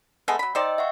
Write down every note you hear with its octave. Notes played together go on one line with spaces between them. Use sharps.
G#3 A3 B3
F#3 B5
D#4 C5 D5 D#5 G5 E6
E5 F#5 C#6